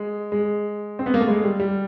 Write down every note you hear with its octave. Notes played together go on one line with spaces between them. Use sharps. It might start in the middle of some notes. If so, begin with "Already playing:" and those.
Already playing: G#3
G#3
C4
B3
A#3
A3
G#3
G3
G3